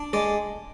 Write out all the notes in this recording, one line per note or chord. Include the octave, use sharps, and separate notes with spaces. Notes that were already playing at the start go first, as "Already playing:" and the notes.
Already playing: D4
G#3 D5